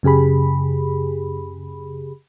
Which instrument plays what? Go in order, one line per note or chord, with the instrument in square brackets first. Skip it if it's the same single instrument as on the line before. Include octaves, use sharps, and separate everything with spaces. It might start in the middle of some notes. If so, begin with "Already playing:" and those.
[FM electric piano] F#2 C#3 G4 G#4 B5